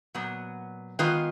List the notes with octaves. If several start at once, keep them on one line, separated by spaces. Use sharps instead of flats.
A#2 F#3 B3
D#3 G#3 B3 F4 B4